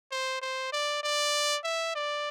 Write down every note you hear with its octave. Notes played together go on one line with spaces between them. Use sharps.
C5
C5
D5
D5
E5
D5